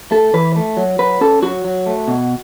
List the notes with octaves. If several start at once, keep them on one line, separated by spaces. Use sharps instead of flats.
A3 A4
E3 B4
A3
F#3
F#3 B4
C#4 A4
F#3 F#4
F#3
A3
B2